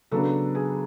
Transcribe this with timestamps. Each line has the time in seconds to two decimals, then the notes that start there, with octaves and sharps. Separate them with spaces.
0.12 C#3 F#3 B3 D4 A4
0.55 G#4